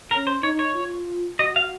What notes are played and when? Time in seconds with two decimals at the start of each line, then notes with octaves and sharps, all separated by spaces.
0.11 C#4 A#4
0.27 C5
0.43 D#4 C#5
0.59 C#5
0.75 F4
1.39 F#4 D#5
1.56 F5